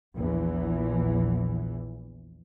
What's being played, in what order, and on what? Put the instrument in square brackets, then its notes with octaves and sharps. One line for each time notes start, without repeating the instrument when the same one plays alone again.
[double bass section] A#1 E2 E3